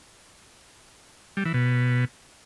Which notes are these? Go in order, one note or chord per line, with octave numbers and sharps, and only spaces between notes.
G3
E3
B2